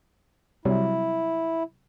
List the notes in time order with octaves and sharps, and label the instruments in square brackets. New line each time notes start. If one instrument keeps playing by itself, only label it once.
[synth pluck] C3 F#3 G3 [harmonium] E4